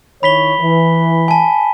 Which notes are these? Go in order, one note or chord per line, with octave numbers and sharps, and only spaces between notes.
D#3 E4 C#5 B5 B6 G7
E3
G#5 A5